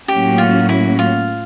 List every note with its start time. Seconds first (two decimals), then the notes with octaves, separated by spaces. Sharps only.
0.08 A2 F#3 A#3 C#4 F#4 G4
0.38 F4
0.69 E4
0.99 F4